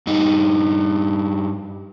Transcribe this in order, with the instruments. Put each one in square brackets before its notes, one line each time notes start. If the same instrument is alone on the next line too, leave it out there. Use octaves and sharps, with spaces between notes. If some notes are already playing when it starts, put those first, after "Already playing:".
[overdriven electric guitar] G2 D#4